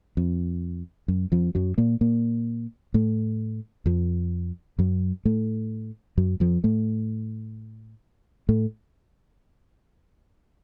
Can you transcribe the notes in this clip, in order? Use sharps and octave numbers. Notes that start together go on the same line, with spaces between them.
F2
F#2
F2 F3
F#2 F#3
A#2 A#3
A#2 A#3
A2 A3
F2 F3
F#2 F#3
A2 A3
F#2 F#3
F2 F3
A2 A3
A2 A3